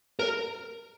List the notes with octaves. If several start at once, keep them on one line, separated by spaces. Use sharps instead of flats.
A#4